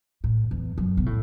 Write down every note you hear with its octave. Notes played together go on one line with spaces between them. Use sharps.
A2
E2
F#2
B2
A2